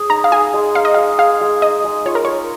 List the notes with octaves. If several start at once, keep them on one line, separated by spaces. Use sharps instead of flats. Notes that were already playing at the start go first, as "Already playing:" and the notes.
Already playing: G#4 C#5
D#4 A#5
F5
G#4 G#5
G#3
D#4 F5
D#5
G#3 F5
G#4 F5
G#3
D#4 D#5
G#3
F4 C#5
A#4
C#5
A#4